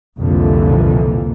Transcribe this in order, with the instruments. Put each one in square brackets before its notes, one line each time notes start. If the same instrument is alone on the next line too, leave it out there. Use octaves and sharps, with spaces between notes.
[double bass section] C2 F2 A#2 D3 E3 A#3